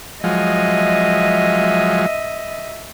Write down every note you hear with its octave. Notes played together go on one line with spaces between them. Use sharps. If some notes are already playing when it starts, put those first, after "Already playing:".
F3 F#3 G#3 D#5 E5